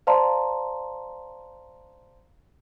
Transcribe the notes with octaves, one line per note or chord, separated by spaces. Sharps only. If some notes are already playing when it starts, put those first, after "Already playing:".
C5 D5 F5 A5 A#5 C6